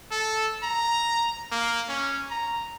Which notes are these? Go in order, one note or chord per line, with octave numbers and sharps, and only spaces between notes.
A4
A#5
A#3
C#4
A#5